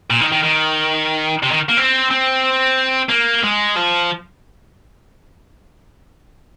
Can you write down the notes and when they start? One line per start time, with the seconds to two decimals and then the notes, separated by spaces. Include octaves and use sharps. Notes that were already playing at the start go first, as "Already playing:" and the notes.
0.10 A#2
0.21 D#3
0.32 D#3
0.43 D#3
1.43 C3
1.51 D#3
1.69 A#3
1.77 C4
2.10 C4
3.10 A#3
3.44 G#3
3.77 F3